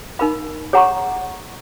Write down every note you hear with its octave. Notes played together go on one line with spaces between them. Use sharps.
D#4 A#4 F5 B5
G#4 C#5 F#5 A#5 C#6